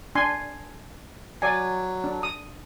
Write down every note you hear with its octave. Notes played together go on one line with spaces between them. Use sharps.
D4 G#5 C6
F#3 D5 G#5
D4
D#6